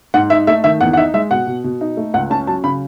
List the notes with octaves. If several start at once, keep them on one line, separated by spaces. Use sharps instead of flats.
G#2 F#5
D#4 E5
A3 E5
D#3 E5
E2 F#5
F#5
D#4 E5
G#3 E5
B2 F#5
B2
B2
D#4
A3
C#2 F#5
C#4 A5
F#3 A5
C#3 B5